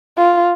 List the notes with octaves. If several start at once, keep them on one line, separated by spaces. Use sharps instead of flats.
F4